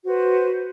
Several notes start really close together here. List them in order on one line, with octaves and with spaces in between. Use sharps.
F#4 C5 B4